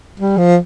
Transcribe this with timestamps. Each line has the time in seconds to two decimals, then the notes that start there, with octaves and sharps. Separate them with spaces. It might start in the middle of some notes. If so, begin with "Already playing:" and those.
0.20 G3
0.38 F3